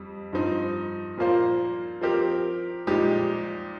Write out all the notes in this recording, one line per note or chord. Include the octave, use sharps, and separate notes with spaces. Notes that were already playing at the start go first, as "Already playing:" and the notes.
Already playing: F2 G3
G2 F3 C4 D#4
A#2 F3 A#3 F4 C5
F3 C4 G4 A#4
A#2 F3 G#3 D#4 G4